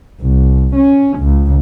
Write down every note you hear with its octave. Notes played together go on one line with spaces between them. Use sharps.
C2
C#4
C#2